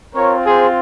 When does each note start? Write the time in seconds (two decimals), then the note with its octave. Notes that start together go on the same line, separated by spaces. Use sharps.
0.15 C4 F4 A#4 C#5
0.44 G#4 C5